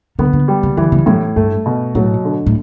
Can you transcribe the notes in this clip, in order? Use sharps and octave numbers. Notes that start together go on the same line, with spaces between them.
D3 B3
D3
G3
C#3
D3 E3
C#3
F#2 A2
G2 A3
B2
A2 F#3
D3
A2